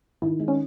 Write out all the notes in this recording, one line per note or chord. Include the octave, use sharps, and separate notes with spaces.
D#3 E4
G#3
C#4